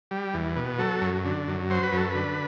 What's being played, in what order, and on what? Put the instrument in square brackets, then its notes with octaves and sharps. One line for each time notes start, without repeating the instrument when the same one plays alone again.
[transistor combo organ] G3
E2
B2
F#3 A4
F#2
D3
F#2
F#3 C5
B4
F#2 A4
D3 B4